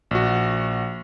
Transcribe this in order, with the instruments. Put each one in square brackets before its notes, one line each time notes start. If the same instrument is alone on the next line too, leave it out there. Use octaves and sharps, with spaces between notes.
[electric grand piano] A#1 F#4